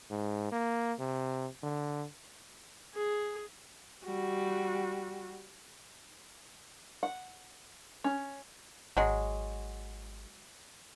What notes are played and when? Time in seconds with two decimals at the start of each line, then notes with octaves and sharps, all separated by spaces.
0.11 G#2
0.52 A#3
0.99 C3
1.63 D3
2.95 G#4
4.05 G3 F#4
7.03 F#5
8.04 C#4
8.97 G#1 F#3 G#3